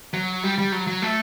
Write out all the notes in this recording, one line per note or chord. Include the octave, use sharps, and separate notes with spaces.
F#3
G3
G3
F#3
F#3
A3